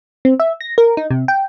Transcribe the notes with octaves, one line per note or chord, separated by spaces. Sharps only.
C4
E5
A#6
A#4
D#4
C3
G5